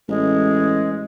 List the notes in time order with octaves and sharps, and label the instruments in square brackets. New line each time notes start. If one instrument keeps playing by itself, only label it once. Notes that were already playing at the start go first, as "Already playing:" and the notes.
[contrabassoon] A1 [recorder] G#3